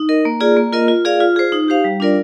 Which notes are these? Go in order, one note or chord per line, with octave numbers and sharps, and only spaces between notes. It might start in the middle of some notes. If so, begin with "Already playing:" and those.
Already playing: D#4
A#4 D#5
A#3
F4 G#4 D5
A#3
F4 A#4 D#5
F4
G#4 D5 F5
F4
G#4 C5
D#4
G4 C5 F5
G3
D4 F4 A#4 D5